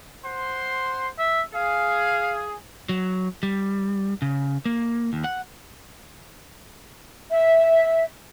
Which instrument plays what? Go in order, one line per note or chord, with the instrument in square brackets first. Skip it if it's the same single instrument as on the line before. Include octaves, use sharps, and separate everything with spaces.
[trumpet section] C5 F#5 C6
[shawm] E5
[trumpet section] G#4 [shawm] F5
[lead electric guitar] F#3
G3
C#3
A#3
D#2
F#5
[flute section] E5